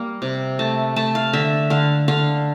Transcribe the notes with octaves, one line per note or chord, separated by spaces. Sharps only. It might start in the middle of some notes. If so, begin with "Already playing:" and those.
Already playing: G3 A#3
C3
A3 A5
A3 A5
F5
D3 E5
D3 F5
D3 F5